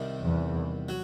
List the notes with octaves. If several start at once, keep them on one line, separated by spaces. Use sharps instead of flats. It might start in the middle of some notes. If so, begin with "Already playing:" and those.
Already playing: C2 C3 D#3 G3
E2
F#3